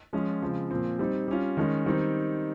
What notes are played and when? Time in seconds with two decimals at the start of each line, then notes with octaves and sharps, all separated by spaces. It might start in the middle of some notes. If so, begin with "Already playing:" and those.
0.13 F3 G#3 C#4 F4
0.42 C#3 F3 G#3 C4
0.71 A#2 F3 C4
0.99 G3 C4 D#4
1.28 G3 C#4 F4
1.57 D#3 G#3 C#4
1.86 D#3 G3 C4 D#4